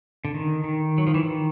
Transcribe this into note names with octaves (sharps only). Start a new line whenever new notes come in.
D3
D#3
D#3
F#3
F3
E3
D#3